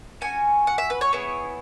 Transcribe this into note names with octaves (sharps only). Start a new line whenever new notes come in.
C#4 F#4 G#5
F#5
E5
B4
C#5
B3 E4 G#4